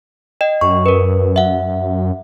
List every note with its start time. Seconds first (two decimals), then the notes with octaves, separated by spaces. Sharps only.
0.41 D#5 G5
0.61 F#2 C#6
0.86 A#4 B4
1.36 E5 F#5